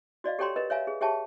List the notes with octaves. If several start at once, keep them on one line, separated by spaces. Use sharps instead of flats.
F#4 D5 D#5 F5
G4 A4 C#5 G5 A#5 C6
A#4 B4 D#5
C#5 E5 F5 G#5 A#5
G#4
G4 G#4 C#5 E5 G5 A5